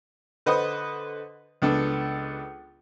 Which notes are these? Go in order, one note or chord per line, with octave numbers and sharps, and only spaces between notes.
D3 B4 C5 D#5 F#5 D#6
C#2 B3 D4 A4